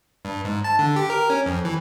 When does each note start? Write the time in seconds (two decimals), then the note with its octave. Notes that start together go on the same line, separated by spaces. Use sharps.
0.25 G2
0.45 G#2
0.64 A5
0.79 D3
0.96 G4
1.10 A#4
1.30 C#4
1.46 F2
1.65 E3